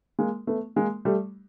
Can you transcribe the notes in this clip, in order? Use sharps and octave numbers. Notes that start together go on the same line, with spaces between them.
G#3 A#3
A3 B3
G#3 A#3
G3 A3